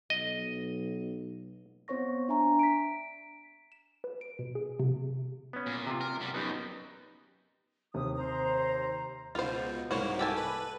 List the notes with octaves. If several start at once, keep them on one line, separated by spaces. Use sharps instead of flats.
B1 D#5
B3 C4 C5 C#5 C#6 A#6
D4 E5 G#5 A#5
B6 D7
E7
B4
D7
B2
G#4
C3
B3 C#4
A#2
C3 F4
A#4
F#2 G3
F#2 B3 D#4 G4
D#2 C3 D#6
C5 A#5
C#2 B2 F4 C5
C2 G#2 A#3 F#4 C5 C#5
G4 A4 G#5
B4